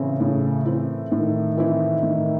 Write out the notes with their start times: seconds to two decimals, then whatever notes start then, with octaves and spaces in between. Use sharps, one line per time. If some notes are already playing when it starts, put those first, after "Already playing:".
Already playing: A2 C#3 E3 C4 E4
0.20 A2
0.65 E3 C4 E4
1.12 A2 D#3
1.57 E3 C4 E4
2.03 A2